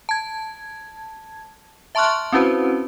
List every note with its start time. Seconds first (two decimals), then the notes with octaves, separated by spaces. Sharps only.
0.09 A5 G#6
1.95 E5 A5 C6 C#6 F6 F#6
2.33 C4 C#4 E4 F#4 B4 C5